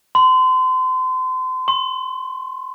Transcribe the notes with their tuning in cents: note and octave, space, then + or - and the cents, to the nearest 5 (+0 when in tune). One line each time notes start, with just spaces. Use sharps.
C6 -35
C6 +35